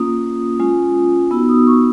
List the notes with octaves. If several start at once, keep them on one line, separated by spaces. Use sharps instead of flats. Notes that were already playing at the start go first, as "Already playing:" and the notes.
Already playing: A#3 C#4 F4 D#6
G#3 C#4 F4
B3 D#4 F#4 E6
D#6
C#6